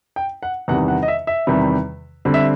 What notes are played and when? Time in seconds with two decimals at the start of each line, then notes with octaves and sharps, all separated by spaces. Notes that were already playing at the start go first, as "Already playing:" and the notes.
0.16 G5
0.43 F#5
0.68 E2 C3 D#3 G3 F#5
0.88 F#5
1.03 D#5
1.08 E5
1.27 E5
1.47 E2 C3 D#3 G3
2.25 D3 G3 C4
2.34 E5